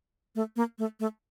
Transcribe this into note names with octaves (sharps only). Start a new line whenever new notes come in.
A3
A#3
A3
A3